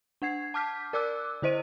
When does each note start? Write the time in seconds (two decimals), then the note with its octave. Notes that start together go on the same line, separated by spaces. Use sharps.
0.22 D4 F#5 G#6 C7
0.54 A5 D6 F6 G6 B6
0.93 A#4 D5 D6 E6 F#6
1.42 D3 E4 C5 D#5 D#7